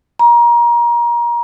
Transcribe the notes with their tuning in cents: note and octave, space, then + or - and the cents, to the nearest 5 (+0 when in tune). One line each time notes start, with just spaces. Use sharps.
A#5 +25